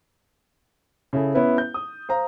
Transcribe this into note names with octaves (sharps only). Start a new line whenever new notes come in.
C#3 E4 G#4 A4
B3 C#4 E4 B4
G6
D#6
C5 F5 A#5